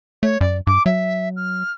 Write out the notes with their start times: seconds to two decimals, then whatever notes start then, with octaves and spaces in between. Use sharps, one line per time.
0.23 A3 C#5
0.41 F#2 D5
0.67 G2 D6
0.86 F#3 E5
1.36 F6